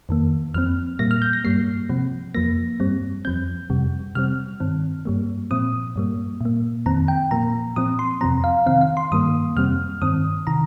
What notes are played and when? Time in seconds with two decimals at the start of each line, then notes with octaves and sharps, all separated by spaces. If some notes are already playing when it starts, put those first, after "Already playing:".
0.09 F2 D#3 A#3
0.54 F2 F3 C4 F6
0.99 A#2 G3 A#3 A#6
1.11 F6
1.22 G6
1.33 A#6
1.44 G2 G3 A#3 C7
1.89 C3 F3 C4
2.34 F2 F3 A#3 A#6
2.80 G2 G3 C4
3.25 F2 F3 C4 G6
3.70 F2 C3 G3
4.15 C3 G3 C4 F6
4.60 G2 D#3 C4
5.05 G2 G3 A#3
5.51 A#2 F3 C4 D#6
5.96 G2 G3 A#3
6.41 A#2 A#3
6.86 F2 D#3 C4 A#5
7.08 G5
7.31 A#2 F3 A#3 A#5
7.76 A#2 F3 C4 D#6
7.99 C6
8.21 F2 C3 F3 C4 A#5
8.44 F5
8.66 C3 D#3 C4 F5
8.81 F5
8.97 C6
9.12 G2 D#3 G3 A#3 D#6
9.56 F2 C3 G3 C4 F6
10.02 G2 D#3 C4 D#6
10.47 C3 D#3 A#5